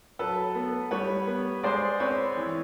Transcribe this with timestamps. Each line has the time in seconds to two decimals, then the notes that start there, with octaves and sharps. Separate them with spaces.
0.19 F#3 A4 B4
0.55 B3
0.91 G3 B4 C#5
1.27 B3
1.63 G#3 C5 D5
2.00 C4 B4 C#5
2.37 E3